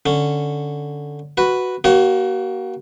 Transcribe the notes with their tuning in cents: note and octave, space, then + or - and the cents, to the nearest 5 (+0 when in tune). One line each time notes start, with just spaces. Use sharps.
D3 +0 C#4 +0
F#4 +0 B4 +0
A#3 +25 F#4 +40 C#5 -20